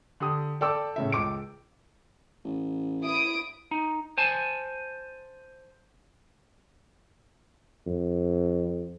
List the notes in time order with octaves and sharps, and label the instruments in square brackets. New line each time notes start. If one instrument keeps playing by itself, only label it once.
[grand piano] D3 G4 D#6
[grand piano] A4 G5 E6 [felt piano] D5 D6
[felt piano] A2 C#3 E5
C#2 D6 D7
[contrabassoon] A1
[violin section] E4 D#6 D7
[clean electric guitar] D#4
C5 G#5 A5
[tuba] F2